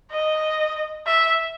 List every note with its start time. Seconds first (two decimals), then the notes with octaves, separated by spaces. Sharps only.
0.11 D#5
1.07 E5